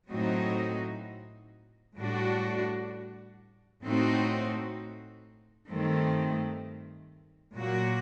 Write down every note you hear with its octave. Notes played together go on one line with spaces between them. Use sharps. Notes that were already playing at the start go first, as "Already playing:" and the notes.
A2 F#3 C4 D#4 F#4
A2 G3 D4 F#4
A2 A3 C4 D#4 F#4
G2 D#3 A3 C4
A#2 F#3 A#3 F#4